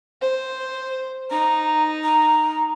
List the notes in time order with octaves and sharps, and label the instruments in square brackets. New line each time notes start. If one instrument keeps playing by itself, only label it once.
[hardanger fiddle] C5
[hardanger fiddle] D#4 [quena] A#5
[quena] A#5